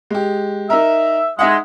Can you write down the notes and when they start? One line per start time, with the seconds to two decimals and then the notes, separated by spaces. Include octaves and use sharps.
0.10 G#3 G4
0.70 D#4 A#4 E5
1.39 G#3 D#4 E5 F#5